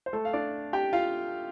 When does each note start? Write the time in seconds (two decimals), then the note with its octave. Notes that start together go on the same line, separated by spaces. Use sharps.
0.06 C5
0.13 A3 A4
0.25 F5
0.33 D4 D5
0.73 G4 G5
0.93 F4 F5